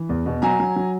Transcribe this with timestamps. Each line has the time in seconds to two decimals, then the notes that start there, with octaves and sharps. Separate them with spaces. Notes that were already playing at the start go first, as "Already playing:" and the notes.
Already playing: E3
0.09 E2
0.26 B2
0.42 F#3 G#5 A#5
0.60 F#3
0.76 F#3